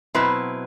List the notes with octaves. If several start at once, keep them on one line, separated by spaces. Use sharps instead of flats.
B2 F#3 C4 E4 B4